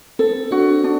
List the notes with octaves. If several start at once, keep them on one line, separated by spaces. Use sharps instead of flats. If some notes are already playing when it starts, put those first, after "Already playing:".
C4 A4
D4 F#4
D4